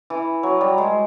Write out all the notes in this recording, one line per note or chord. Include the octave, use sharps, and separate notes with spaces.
E3
F#3
G3
G#3